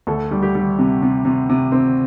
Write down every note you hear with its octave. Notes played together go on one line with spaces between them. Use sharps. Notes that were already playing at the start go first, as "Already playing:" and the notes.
D2 A4
G3
G4
G3
C3
C3
C3
C3
C4